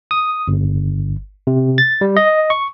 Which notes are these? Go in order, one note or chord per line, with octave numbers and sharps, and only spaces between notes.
D#6
G1
C3
A6
G3
D#5
C#6